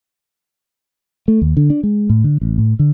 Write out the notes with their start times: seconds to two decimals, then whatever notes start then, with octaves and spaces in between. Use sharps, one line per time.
1.28 A3
1.41 D#2
1.57 D3
1.70 D4
1.83 G#3
2.10 A2
2.24 D3
2.41 A1
2.58 A2
2.79 D3